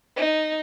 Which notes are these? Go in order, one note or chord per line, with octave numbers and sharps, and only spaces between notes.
D#4